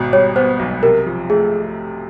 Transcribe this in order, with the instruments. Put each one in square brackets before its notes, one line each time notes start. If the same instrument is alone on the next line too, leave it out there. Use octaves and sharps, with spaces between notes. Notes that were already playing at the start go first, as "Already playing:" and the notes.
Already playing: [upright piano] G#1 B2
[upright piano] G3 [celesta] C#5
[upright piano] B3 [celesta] C5
[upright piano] B1
[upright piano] C3 [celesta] A#4
[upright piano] F3
[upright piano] A3 [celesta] G#4